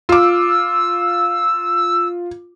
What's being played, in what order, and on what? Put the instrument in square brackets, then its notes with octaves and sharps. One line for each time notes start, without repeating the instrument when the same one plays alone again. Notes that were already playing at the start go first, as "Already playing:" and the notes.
[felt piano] F4 D6 [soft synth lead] E6